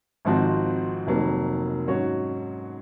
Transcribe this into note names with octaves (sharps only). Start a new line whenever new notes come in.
G#1 G#2 F3 C4 F#4
F1 F2 D#3 F#3 A#3
G#2 F#3 C#4 F#4 C#5